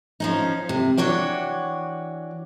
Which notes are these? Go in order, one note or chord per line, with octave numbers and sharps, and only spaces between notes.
F3 C#4 D#4
C3
E3 D4 F#4 C#5 G5